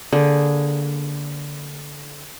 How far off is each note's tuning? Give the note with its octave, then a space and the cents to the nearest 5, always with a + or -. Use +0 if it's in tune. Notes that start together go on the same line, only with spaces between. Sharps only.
D3 -20 A#3 +0 G#4 +0